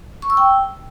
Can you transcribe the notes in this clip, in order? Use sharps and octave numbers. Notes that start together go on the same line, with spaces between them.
C#6
E6
G5